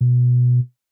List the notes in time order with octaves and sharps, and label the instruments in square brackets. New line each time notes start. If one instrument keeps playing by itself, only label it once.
[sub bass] B2